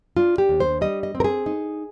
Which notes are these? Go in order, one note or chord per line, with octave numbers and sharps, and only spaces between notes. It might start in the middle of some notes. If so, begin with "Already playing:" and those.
D4 F4
G4
D#2
C5
G3 D#5
D#5
C4
A#4
G#4
D#4